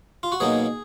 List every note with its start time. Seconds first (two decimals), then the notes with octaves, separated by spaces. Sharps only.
0.23 F4
0.32 F#4
0.40 B2 F#3 A#3 D#4 G#4